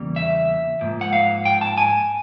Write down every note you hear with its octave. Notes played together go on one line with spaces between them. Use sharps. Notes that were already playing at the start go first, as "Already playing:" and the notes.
Already playing: E2 C#3 E3 G3 A#3
E5
G#2 F3 A#3
F#5
F5
G5
A5
G#5